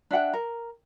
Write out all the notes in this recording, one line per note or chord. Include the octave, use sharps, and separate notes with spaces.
D4 E5 F#5 G5
A#4